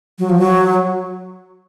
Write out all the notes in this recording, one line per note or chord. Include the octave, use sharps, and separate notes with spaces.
F#3
F3
F#3